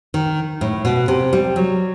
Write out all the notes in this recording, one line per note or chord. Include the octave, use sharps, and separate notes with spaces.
D#3
A2
B2
C3
G3
F#3